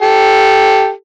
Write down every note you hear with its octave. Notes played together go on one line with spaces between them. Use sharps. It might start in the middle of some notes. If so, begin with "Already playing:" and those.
G4 A4